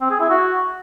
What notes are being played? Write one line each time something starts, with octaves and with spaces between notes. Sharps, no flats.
C4
G#4
E4
F#4